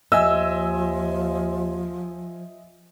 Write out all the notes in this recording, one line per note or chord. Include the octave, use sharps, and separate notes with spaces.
D#2 F3 D#5 E5 G#5 E6